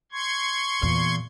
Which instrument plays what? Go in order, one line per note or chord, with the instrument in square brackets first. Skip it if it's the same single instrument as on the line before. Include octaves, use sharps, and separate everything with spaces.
[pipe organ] C6 C#6 G#6
[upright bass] E2 A#2